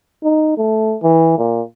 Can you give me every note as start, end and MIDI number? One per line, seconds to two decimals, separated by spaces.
0.23 0.53 63
0.58 0.97 57
1.03 1.33 52
1.38 1.61 46